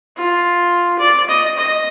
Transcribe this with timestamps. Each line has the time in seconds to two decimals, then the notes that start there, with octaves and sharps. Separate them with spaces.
0.17 F4
0.99 D5
1.29 D#5
1.58 D#5